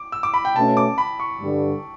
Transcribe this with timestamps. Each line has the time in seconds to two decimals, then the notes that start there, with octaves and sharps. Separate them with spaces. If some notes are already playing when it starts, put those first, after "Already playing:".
Already playing: D6
0.12 E6
0.23 D6
0.34 B5
0.45 G5
0.55 B2 A3 C#4 A5
0.77 D6
0.98 B5
1.20 C#6
1.41 G2 D3 G3